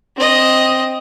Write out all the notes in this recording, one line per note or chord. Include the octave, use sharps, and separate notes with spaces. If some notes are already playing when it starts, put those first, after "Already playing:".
C4 D#5